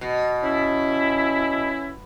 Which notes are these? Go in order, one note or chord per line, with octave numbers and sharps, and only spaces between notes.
B2
C#4 E4